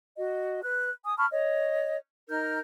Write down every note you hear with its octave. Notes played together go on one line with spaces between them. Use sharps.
F#4 D#5
B4 F#6
G#5 D#6
A5 B5 C#6 F6
C#5 D#5
D#4 A#4 F6 G6